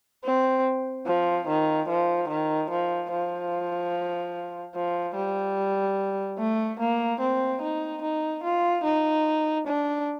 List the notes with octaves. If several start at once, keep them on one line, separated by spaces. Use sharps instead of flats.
C4
F3
D#3
F3
D#3
F3
F3
F3
G3
A3
A#3
C4
D#4
D#4
F4
D#4
D4